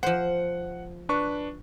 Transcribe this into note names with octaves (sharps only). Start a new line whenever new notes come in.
F3 C5 F#5
D4 B4 C#6